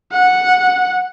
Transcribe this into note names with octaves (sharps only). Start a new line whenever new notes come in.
F#5